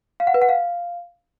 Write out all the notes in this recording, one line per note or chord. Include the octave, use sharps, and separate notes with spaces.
F5
F#5
B4
F#5
F5